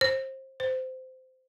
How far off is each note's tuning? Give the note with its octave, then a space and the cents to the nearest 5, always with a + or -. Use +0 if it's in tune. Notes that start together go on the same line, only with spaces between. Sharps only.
C5 +25
C5 -15